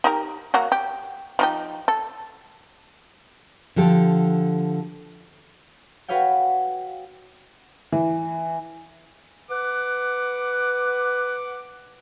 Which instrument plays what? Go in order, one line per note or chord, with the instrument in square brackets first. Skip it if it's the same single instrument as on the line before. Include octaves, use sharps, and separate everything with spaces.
[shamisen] D#4 G4 A#4
F#3 A#3 F#4
G4
F3 D#4 G4
A4
[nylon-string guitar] D3 F3 G4 A4
[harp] F#4 B4 C#5 F5 G5
[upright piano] E3
[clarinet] B4 [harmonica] F#5 D6